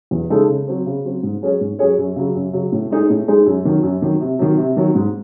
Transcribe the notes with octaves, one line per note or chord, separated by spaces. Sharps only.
E2
C#3 G#3 D#4 A4
C#3
F#3 C4
C#3
F#3 C4
G#2
F#3 C#4 G#4 C#5
G#2
F#3 C#4 G#4 C#5
F#2
C#3 F#3
F#2
C#3 F#3
A2
G#3 D#4 G#4
A2
G#3 D#4 G#4
F#2
D#3 F#3
F#2
D#3 F#3
C3
D#3 F#3
C3
D#3 F#3
G#2